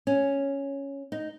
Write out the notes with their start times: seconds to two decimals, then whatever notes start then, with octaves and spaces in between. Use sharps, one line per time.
0.07 C#4
1.12 D#4